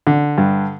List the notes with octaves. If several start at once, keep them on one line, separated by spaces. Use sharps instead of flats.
D3
G2